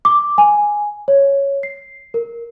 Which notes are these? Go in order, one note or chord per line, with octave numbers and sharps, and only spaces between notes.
D6
G#5
C#5
C7
A#4